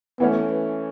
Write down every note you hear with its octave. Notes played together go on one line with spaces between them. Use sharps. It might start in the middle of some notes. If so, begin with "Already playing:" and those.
E3 A3 B3 C#4